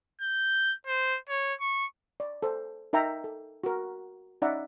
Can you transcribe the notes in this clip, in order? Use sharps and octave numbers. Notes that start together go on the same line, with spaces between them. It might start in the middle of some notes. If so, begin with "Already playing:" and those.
G6
C5
C#5
C#6
D5
A4 C5
D#4 A#4 E5 G5 A#5
A4
F#4 A#4
C#4 D#4 D5 E5 F#5 A#5